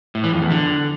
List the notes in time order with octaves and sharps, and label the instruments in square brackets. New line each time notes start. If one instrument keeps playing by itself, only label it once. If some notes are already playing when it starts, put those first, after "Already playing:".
[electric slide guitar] A2
E3
F2
E2
D3